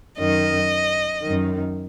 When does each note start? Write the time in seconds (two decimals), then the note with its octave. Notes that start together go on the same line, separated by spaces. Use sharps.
0.18 F#2 D#3 D#5
1.22 F#2 D#3